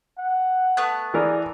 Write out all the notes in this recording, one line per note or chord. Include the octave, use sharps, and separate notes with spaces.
F#5
A3 B3 F#6
E3 G#4 A#4 D5